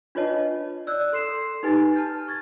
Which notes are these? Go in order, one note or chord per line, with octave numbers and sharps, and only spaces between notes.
D4 F4 B4 C#5 D#5 A5
D5 E6 F#6 G6
A4 C6 C7 E7
D#4 G4 B4 G#5 A6
A5 F6 G6
C#6 G#6 A6